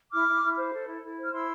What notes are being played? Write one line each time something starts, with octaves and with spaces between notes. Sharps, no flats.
E4 D6 F6
E4
E4
C5
A4
E4
E4
C5
F6
E4 C6 E6